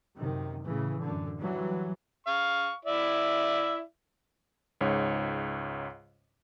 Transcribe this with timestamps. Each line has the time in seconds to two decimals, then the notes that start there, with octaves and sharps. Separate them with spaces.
0.16 F#2 C3 D#3
0.64 A2 C#3 E3
1.02 F#2 D3
1.41 E3 F#3 G3
2.27 F5 C#6
2.85 E4 D5 E5
4.81 C#2 G#2 C#5